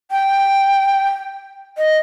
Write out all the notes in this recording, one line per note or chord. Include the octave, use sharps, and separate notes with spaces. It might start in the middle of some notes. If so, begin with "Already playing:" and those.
G5
D#5